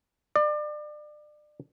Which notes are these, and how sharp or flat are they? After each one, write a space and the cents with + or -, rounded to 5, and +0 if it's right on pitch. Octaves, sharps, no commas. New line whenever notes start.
D5 +30